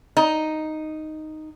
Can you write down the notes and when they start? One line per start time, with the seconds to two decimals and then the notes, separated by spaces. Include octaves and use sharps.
0.17 D#4